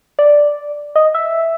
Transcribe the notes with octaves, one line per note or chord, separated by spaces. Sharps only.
D5
D#5
E5